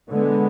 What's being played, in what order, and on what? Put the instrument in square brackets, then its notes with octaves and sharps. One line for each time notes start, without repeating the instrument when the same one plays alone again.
[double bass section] D3 G#3 B3